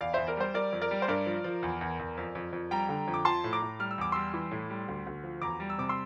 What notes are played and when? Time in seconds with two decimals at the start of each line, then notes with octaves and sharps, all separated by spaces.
0.01 E2 D5 F5
0.13 E2 C5 E5
0.27 A#4 D5
0.37 G3 C5
0.54 G3 A#4 D5
0.72 F2
0.82 A#4 D5
0.91 G3
1.02 C5
1.08 G2 A#4 D5
1.26 F3
1.44 F3
1.63 E2
1.81 E2
1.99 E2
2.17 F2
2.35 F2
2.53 F2
2.71 G3 G5 A#5
2.89 D3
3.07 F2
3.14 D6
3.25 F3 A5 C6
3.44 A2
3.53 A#5 D6
3.62 A2
3.79 G3 F6
3.91 E6
3.98 E2 D6
4.12 G3 C6 E6
4.34 E3
4.51 A2
4.70 G3
4.88 D2
5.07 D2
5.23 F3
5.42 E2 A#5 D6
5.60 G3
5.70 E6
5.78 C3 D6
5.89 C6 E6